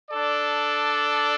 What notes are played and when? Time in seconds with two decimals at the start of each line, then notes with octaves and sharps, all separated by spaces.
0.11 D4 A4 D5